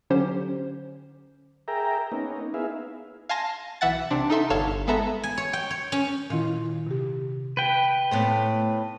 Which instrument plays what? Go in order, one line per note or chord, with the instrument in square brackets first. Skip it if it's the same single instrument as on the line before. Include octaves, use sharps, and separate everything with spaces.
[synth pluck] D3 F#3 C#4 G4 C5
[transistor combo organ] G#4 A#4 E5 G5 A#5
A#3 B3 C#4 D#4
B3 D#4 E4 G#4 E5 F5
[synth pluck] F5 G#5 A5 C6 A#6
B1 E3 E5 F#5 A6
C3 C4 D4
D#4 A4 E5 C6
G1 A4 C#5 F5 E7
G#3 B3 A4 E5 A#5
[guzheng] G#5
C#5
G5
C#5
C#4
[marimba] A#2 D#3 E4 [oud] F4
[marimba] C3 G4
[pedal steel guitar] B4 G5
[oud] A2 B3 C4